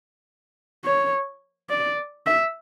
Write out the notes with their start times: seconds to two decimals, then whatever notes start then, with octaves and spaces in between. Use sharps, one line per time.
0.85 C#5
1.70 D5
2.27 E5